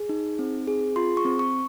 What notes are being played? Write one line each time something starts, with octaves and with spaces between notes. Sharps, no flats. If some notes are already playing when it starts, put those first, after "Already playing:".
Already playing: G#4
D#4
C4
G#4
F4 C6
C#6
C4
C#6